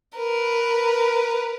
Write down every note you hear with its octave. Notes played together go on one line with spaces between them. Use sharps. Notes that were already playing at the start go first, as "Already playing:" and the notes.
A#4 B4